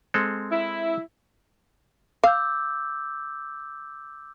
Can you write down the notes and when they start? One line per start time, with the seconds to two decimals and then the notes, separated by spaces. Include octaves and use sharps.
0.14 G#3 C4 A4
0.52 E4
2.23 F5 D6 E6 G6